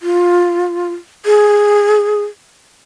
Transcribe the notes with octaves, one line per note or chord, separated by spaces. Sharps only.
F4
G#4